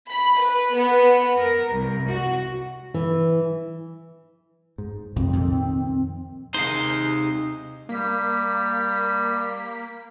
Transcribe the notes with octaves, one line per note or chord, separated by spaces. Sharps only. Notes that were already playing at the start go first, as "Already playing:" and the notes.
B5
B4
B3
A#4
C2
F#4
E3
G#2
C2 F2 A2 C4
F2 A#2 D#3
C3 G#3 D#4 C5 F5
G3 A#3 B6